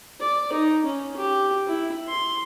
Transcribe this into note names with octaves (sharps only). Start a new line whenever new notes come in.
D5
D#4
C#4
G4
E4
C6